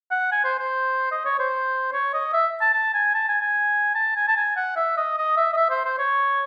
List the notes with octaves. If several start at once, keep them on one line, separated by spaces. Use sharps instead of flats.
F#5
G#5
C5
C5
D#5
C#5
C5
C#5
D#5
E5
A5
A5
G#5
A5
G#5
G#5
A5
G#5
A5
G#5
F#5
E5
D#5
D#5
E5
D#5
E5
C5
C5
C#5